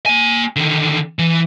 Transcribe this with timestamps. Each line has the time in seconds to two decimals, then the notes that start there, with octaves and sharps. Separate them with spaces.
0.06 A#3 G#5
0.56 D3 D#3
1.19 E3